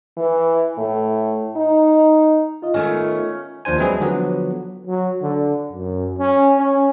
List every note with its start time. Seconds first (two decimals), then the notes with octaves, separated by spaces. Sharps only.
0.17 E3
0.78 A2
1.56 D#4
2.62 F4 D#5
2.74 D#3 A3 B3 C#4
3.65 D#2 F3 D4 C5 G#5
3.78 E3 F#3 G#3 C4 E4 G#4
4.00 D3 F3 F#3 B3
4.87 F#3
5.22 D3
5.72 F#2
6.19 C#4
6.57 C#4